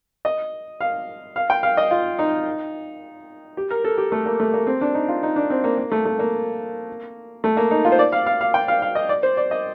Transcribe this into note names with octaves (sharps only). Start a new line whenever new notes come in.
D#5
F5
F5
G5
F5
D#5
F4
D#4
G4
A#4
A4
G4
A3
A#3
A3
A#3
C4
D4
D#4
F4
D#4
D4
C4
A#3
A#3
A3
A3
A#3
A3
A#3
D#4
F4
C5
D5
F5
F5
F5
G5
F5
F5
D#5
D5
C5
D5
D#5